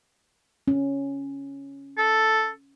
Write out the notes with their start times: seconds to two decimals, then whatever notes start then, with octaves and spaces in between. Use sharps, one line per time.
0.68 C#4
1.98 A4